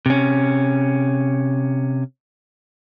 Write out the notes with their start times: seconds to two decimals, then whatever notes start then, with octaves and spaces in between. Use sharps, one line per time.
0.06 C3 C#4